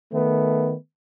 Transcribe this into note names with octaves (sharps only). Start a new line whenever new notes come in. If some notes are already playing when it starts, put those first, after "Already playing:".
D#3 A3 B3